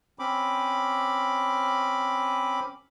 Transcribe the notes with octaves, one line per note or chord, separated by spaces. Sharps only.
C4 C#4 B5 D6